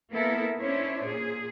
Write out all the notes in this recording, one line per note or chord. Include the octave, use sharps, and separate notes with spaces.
A#3 B3 E4 A4 A#4
C#4 D4 E4 C5 C#5
A#2 G#4